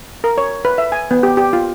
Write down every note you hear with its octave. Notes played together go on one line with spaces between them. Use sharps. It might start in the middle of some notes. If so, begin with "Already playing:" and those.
A#4
C#5
B4
E5
G#5
B3
G4
G4
F4